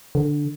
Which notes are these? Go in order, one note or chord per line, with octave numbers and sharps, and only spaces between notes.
D3